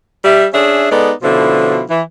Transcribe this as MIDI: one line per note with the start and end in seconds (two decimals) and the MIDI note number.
0.24 0.45 55
0.24 0.45 76
0.53 0.89 61
0.53 0.89 62
0.53 0.89 68
0.53 0.89 76
0.90 1.11 56
0.90 1.11 59
0.90 1.11 63
0.90 1.11 69
0.90 1.11 74
1.22 1.81 47
1.22 1.81 50
1.22 1.81 53
1.22 1.81 61
1.22 1.81 64
1.89 2.01 52